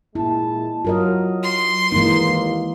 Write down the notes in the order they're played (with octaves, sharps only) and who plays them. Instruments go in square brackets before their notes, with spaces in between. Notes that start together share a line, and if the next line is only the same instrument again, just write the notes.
[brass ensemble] A#2 G#3 A5 [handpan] E4
[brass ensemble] F#3 [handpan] F4 A#4 D#5
[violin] C6
[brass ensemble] D#2 A#3 [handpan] E3 G#3 D#4